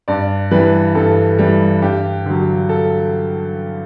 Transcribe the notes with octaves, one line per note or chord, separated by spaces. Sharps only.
G2 D5
E3 G3 B4
G2 A4
E3 G3
G2 G4
D3 F#3
A4